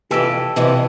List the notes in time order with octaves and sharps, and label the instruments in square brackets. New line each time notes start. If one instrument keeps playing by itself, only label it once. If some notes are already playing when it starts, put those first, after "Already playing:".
[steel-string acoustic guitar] F2 C3 E3 [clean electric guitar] G4 A4
[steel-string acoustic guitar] F2 C3 E3